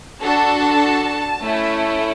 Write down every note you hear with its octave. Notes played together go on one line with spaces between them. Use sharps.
D4 F#4 A4 A5
A3 C#4 E4